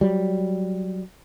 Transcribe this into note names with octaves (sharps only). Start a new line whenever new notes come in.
F#3 G3